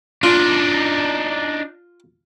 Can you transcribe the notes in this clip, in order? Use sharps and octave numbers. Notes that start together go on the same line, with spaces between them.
D4 D#4 F4